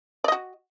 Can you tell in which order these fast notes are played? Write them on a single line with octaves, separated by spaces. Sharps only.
D5 D#5 F#4